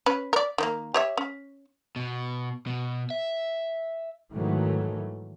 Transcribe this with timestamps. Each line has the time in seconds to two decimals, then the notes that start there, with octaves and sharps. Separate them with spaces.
0.06 C#4 B4
0.33 A#4 D5
0.58 D#3 F#3 A#3
0.94 G4 C#5 E5
1.17 C#4
1.96 B2
2.67 B2
3.10 E5
4.34 G#2 D#3 E3 F#3 A3